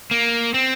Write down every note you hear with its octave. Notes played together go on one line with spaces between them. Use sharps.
A#3
C4